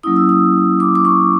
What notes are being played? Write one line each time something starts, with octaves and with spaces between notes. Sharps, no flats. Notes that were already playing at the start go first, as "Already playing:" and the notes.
F#3 A#3 C#4 E4 D#6
E6
D#6
D6
D6
C#6